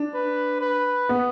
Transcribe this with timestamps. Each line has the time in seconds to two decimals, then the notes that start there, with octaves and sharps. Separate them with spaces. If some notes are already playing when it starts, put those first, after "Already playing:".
Already playing: D4
0.14 B4
0.61 B4
1.09 B3